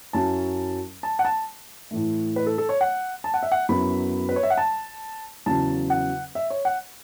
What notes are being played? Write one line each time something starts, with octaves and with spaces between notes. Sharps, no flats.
F#2 F#3 C#4 E4 A5
A5
F#5
A5
A2 E3 A3
B4
A4
A4
C#5
F#5
A5
F#5
E5
F#5
F#2 F#3 B3 E4 B5
B4
C#5
E5
F#5
A5
E2 C#3 F#3 A5
F#5
E5
C#5
F#5